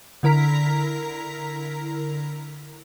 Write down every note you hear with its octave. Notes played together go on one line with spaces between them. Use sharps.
D3 E4 A#4 A#5 B6